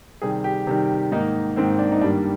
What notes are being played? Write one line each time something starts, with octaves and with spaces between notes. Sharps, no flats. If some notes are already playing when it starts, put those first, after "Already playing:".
C3 D#3 G3 G#4
G4
C3 D#3 G3
G#2 D#3 A#3 D#4
G#2 D#3 A#3 C4
D4
D#4
G2 D#3 G3 A#3 D4